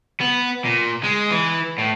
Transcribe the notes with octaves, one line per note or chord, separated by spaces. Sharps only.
B3
A#2
G#3
E3
A2